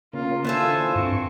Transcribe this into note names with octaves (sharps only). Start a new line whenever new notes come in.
C#3 A#3 F4
D3 E3 F4 A4 C5 G#5
G2 C4 C#6